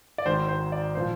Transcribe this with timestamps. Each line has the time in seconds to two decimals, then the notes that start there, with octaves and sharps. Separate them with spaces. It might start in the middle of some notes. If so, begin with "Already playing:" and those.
0.18 D5
0.26 G#1 G#2 D#3 C5
0.48 C5
0.72 D5
0.95 A#2 F3 C5